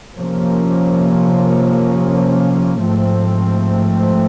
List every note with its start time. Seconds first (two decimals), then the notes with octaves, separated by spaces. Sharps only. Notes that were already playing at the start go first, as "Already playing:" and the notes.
0.16 C3 F3 A#3 C#4
2.82 G#2 F3 A3 C4